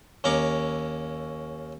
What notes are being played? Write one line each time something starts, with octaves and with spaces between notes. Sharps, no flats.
D#2 C#4 A#4 C#6 D6